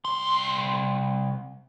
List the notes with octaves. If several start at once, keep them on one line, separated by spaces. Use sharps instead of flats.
C2 C6